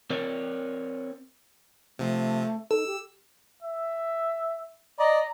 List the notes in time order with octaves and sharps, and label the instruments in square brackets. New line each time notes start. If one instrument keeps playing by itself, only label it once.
[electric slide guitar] C4 A#4 C#5 D5
[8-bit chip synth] C3 F3 [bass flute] A3
[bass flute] D#4 [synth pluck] A4 [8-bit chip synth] E6
[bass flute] G4
[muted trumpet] E5
[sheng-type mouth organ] D5 D#5 [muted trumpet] A#5